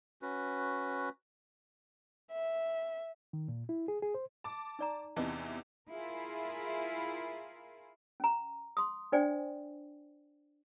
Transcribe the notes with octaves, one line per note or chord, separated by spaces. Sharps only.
C#4 F#4 B4
E5
D#3
A#2
E4
G#4
G#4
C5
A5 D6
D#4 D5 A#5
E2 C3 E3 D#4 D#5 C#6
E4 F4 G#4 A#4
C#4 A#5
C6 D#6
D4 C5 D5 G5 G#5